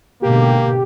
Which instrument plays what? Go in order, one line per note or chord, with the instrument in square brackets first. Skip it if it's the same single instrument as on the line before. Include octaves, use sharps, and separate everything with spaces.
[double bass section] G#2 B2 D3 [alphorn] A#3 [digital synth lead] G4